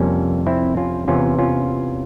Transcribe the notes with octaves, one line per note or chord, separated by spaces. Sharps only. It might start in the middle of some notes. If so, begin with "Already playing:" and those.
Already playing: F2 C3 G3 A#3 C#4
C4 E4
C#4 F4
E2 C3 E3 C#4 F4
C#4 F4